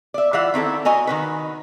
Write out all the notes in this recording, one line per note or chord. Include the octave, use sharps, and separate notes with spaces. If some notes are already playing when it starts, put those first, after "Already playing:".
D5 E5
E3 F4 E5 F#5
D#3 C4 E4 A4
F#4 D#5 G#5 A#5
D#3 F#4 B4